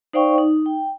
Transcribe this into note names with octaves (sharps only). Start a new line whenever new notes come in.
D#4 C5 D5 F5 G5 C#6
D#4
G5